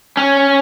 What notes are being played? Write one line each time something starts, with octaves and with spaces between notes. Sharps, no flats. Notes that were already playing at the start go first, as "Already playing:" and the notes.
C#4